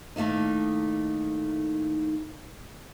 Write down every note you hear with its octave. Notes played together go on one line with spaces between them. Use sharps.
A2 D#3 A3 A#3 D#4